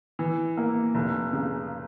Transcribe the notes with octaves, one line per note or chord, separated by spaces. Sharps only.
E3
A#3
F1
C#3